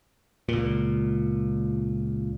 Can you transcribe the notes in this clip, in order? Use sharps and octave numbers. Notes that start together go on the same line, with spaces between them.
C#2 A#2